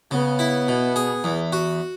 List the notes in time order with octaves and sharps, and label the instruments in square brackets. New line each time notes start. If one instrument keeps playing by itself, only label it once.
[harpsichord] C#3 [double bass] B3
[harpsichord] E4
B2
G#4
E2
F#4